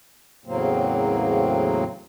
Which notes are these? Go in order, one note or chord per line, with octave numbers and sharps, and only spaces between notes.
E2 A2 C#3 F#3 A#3 C4